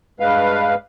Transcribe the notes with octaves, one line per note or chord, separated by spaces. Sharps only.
G2 G#3 B4 F5